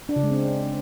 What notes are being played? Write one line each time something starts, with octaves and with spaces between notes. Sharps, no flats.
D4
C#3
G#3
C4